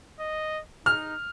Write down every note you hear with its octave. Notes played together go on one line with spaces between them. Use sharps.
D#5
D#4 F6